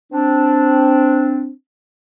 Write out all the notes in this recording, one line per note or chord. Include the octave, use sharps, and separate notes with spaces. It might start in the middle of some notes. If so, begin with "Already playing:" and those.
C4 D4